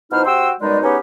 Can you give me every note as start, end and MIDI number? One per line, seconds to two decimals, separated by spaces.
0.12 0.26 47
0.12 0.26 53
0.12 0.26 63
0.12 0.26 64
0.12 0.26 72
0.12 0.26 89
0.26 0.50 48
0.26 0.50 66
0.26 0.50 79
0.26 0.50 84
0.26 0.50 88
0.61 0.82 42
0.61 0.82 47
0.61 0.82 55
0.61 0.82 56
0.61 0.82 63
0.61 0.82 74
0.82 0.97 40
0.82 0.97 59
0.82 0.97 61
0.82 0.97 63
0.82 0.97 67
0.82 0.97 73